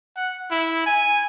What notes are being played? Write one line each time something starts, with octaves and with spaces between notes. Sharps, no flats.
F#5
E4
G#5